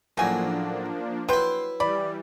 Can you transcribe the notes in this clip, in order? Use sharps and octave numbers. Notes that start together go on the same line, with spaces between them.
A2 C#3 F3 F#3 A#3 D4 G#5
F#3 E4 B4 G5 C6
E3 G3 D5 B5